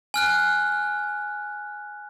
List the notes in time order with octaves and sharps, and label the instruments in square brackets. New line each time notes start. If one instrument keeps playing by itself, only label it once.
[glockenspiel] G#5 F6 F#6